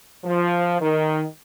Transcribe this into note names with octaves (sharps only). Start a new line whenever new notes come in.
F3
D#3